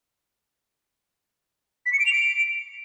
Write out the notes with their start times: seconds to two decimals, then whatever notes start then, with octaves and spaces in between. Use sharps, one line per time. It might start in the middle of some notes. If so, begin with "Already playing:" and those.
1.86 B6
1.93 C#7
1.99 D7
2.06 F7
2.13 D7